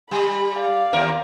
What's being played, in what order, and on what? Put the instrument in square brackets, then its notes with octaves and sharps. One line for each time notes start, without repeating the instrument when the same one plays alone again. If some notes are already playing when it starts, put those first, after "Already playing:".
[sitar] G3 [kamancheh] B5
[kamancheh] D5 F5
[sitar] D#2 A#4